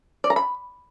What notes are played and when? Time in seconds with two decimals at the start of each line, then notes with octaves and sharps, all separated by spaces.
0.24 D5
0.30 A#5
0.36 B5